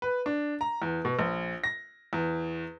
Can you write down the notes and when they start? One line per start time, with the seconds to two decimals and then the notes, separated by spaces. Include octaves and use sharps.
0.02 B4
0.26 D4
0.61 A#5
0.82 E2
1.05 B2
1.19 A#1
1.64 A#6
2.13 E2